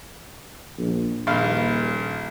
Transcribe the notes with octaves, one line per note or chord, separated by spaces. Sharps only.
A#1
D#1 A#1 F5